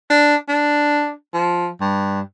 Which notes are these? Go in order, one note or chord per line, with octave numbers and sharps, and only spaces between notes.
D4
D4
F3
G2